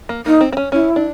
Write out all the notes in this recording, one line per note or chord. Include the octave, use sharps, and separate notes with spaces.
A#3
A#3 D#4
C4
C4
C#4
C#4 E4
D4